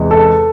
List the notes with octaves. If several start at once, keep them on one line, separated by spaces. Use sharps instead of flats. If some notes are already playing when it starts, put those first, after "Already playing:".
Already playing: E2 C3 E3 G#3
A4